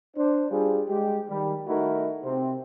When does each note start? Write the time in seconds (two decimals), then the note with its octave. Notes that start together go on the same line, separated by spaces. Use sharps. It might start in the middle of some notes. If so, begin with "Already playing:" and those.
0.17 D4 C5
0.50 G3 D4 F4 G#4
0.89 G#3 G4
1.30 D#3 G3
1.67 D#3 A3 D#4 E4 F#4 A#4
2.24 C3 C4